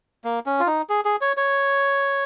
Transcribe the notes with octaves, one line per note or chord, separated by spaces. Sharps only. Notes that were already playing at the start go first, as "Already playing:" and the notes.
A#3
C#4
F4
D#4
G#4
G#4
C#5
C#5